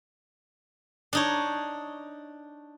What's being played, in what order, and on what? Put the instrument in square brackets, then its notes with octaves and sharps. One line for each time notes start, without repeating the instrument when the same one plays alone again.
[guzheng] D4 D#4 C#5